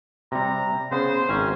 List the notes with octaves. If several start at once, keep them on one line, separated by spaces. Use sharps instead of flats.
C3 G3 A#5
C#3 B3 C5
G#1 C4 C#4 A#5